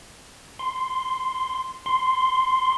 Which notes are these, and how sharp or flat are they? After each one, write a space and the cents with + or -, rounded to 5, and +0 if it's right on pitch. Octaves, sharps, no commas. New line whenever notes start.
C6 +0
C6 +0